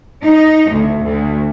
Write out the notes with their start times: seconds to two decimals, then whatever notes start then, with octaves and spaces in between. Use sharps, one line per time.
0.23 D#4
0.72 D2
1.04 D2